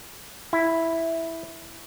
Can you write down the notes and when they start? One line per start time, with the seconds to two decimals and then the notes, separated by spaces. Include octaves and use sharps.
0.53 E4